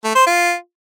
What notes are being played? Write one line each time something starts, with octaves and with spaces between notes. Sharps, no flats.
A3
C5
F4